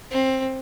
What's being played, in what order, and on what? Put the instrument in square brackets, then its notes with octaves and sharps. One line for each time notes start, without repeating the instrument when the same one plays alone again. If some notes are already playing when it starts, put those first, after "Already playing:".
[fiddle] C4